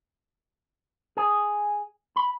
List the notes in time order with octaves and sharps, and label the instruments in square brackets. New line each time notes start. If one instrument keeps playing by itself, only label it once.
[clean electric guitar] G#4
B5